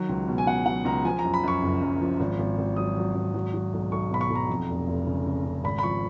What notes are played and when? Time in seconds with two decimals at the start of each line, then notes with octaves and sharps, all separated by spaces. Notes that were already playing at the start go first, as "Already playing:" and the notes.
Already playing: D#3 F#3
0.09 C#2
0.28 B2
0.38 G#5
0.47 B2 F#5
0.66 F#3 F#5
0.85 C#2 A#5
1.05 F3 G#5
1.19 A#5
1.24 F#2
1.34 B5
1.44 F#2 C#6
1.62 F#1
1.81 F#2
2.01 F3
2.19 G#1
2.39 G#1
2.58 G#1
2.76 F#3 D#6
2.97 F#3
3.15 G#1
3.34 F#3
3.54 F#3
3.73 B1
3.92 B1 C#6
4.12 B2 B5
4.21 C#6
4.30 B1
4.35 A#5
4.49 F2
4.69 F1
4.87 F1
5.07 C#3
5.26 C#3
5.45 C#3
5.64 G#1 B5
5.79 B5
5.83 F3 C#6